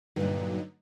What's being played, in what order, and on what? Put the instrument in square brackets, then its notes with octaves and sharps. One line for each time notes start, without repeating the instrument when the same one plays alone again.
[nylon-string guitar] G2 A#2 [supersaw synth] D3 F#3 D#4